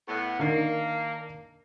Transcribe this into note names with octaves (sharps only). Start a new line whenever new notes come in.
A2 B3
D#3 A#3 D4 C7